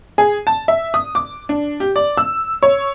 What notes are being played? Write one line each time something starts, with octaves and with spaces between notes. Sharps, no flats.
G#4
A5
E5
D#6
D6
D4
G4
D5
E6
C#5